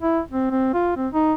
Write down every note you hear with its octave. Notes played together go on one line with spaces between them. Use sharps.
E4
C4
C4
F4
C4
D#4